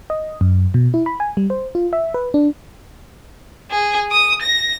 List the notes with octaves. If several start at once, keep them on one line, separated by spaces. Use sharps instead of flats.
D#5
F#2
B2
E4
B5
G#5
G3
C5
F4
E5
B4
D4
G#4
D#6
A#6